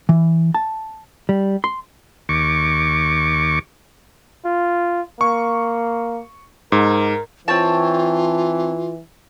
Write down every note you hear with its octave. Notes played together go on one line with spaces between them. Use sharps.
E3
A5
G3
C6
D#2 C#6 D6
F4
A#3 C#6
G#2 A#4
E3 C4 F4 C#5 A5